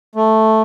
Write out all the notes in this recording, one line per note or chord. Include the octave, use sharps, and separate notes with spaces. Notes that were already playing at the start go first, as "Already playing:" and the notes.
A3